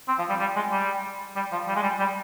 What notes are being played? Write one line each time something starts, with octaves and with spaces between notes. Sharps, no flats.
C4
F3
G3
G3
G#3
G3
G3
F3
G3
G#3
G3
G3